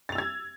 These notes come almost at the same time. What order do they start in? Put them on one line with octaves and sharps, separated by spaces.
A6 F7 E6 G#6